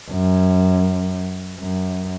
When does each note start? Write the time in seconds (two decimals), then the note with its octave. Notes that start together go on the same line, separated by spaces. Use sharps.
0.11 F#2
1.59 F#2